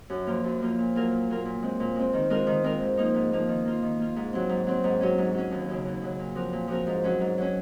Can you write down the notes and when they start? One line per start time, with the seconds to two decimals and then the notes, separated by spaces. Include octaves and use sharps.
0.10 F#2
0.27 F3 A#3 F4
0.44 F#2
0.61 F3 A#3 F4
0.78 A#2
0.95 F#3 A#3 F4 A#4
1.12 A#2
1.29 F#3 A#3 F4 A#4
1.46 A#2
1.62 G#3 C4
1.80 A#2
1.96 G#3 C4
2.13 D#3
2.30 G#3 C4 F4 A#4
2.47 D#3
2.64 G#3 C4 F4 A#4
2.80 G#2
2.97 F3 A#3 D#4
3.14 G#2
3.32 F3 A#3 D#4
3.48 D#3
3.65 A#3 F4
3.82 D#3
4.00 A#3 F4
4.16 G#2
4.33 F#3 C4
4.49 G#2
4.67 F#3 C4
4.84 G#2
5.01 F#3 C#4
5.18 G#2
5.34 F#3 C#4
5.51 D#2
5.69 C#3 F#3
5.85 D#2
6.02 C#3 F#3
6.19 A#2
6.35 F3 C4 F#4 A#4
6.53 A#2
6.68 F3 C4 F#4 A#4
6.87 G#2
7.04 F#3 C#4
7.20 G#2
7.38 F#3 C#4